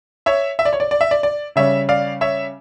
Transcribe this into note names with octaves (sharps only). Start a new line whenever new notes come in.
C#5 E5
E5
D5
C#5
D5
D5
E5
D5
D5
C#3 G3 C#4 C#5 E5
D5 F5
C#5 E5